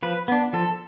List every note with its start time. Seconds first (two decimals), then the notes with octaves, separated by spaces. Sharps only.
0.03 F3 B4
0.28 B3 D4
0.53 F3 A4